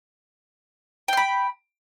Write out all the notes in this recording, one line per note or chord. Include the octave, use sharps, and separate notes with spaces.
G5 B5 C6